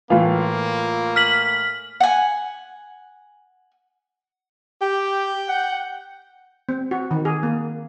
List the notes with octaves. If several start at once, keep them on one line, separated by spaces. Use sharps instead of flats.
A2 E3 A#3 F4
F6 B6 F#7
F#5 G#5
G4 G5
F#5
C4
F#4
D#3
G#4
A#3